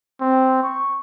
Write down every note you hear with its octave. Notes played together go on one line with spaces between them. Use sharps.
C4
C#6